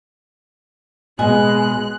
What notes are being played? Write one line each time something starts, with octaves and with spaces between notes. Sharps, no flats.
B2 G#3 B3 D#5 G#5 F#6